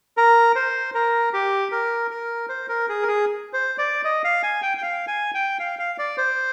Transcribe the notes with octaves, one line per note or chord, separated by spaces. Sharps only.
A#4
C5
A#4
G4
A#4
A#4
C5
A#4
G#4
A#4
G#4
C5
D5
D#5
F5
G#5
G5
G5
F5
G#5
G5
F5
F5
D5
C5